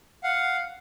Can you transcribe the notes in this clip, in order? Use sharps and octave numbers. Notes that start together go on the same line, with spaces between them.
F5 F#5